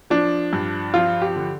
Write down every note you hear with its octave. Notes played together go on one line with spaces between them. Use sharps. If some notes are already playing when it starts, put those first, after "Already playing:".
F3 D4
G2
F3 F4
G4
D3